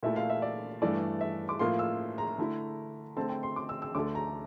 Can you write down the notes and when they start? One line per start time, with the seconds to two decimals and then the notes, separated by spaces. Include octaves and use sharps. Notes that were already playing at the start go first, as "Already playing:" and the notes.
0.03 A#2 A3 E4 E5
0.16 F5
0.30 E5
0.42 D5
0.82 G2 E3 A3 D5
1.21 E5
1.49 D6
1.59 A2 F3 A#3 F4 C6
1.79 E6
2.18 A#5
2.38 D3 A3 E4
3.16 D3 A3 C4 A5
3.29 G5
3.43 C6
3.56 D6
3.69 E6
3.82 E6
3.95 D2 D3 A3 D6
4.15 A#5